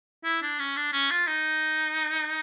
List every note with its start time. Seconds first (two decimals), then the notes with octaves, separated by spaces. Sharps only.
0.24 E4
0.42 D4
0.59 C#4
0.76 D4
0.93 C#4
1.11 F4
1.27 D#4